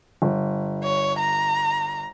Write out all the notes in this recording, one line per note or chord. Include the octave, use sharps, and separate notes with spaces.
G1
C#5
A#5